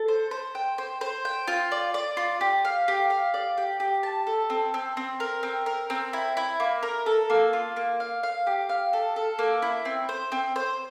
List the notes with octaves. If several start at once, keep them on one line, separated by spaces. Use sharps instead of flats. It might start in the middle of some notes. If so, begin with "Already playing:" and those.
Already playing: A4
C5
C5
G5
C5
C5
G5
F4
D5
D5
F4
G4
F5
G4
F5
D5
G4
G4
A5
A4
C4
C4
C4
A#4
C4
A#4
C4
E4
E4
A#3
A#4
A4
A#3
F4
A#3
F5
F5
G4
F5
A4
A4
A#3
E4
C4
C5
C4
C5